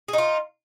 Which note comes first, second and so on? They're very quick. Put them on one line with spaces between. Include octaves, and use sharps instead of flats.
G#4 D#4 F4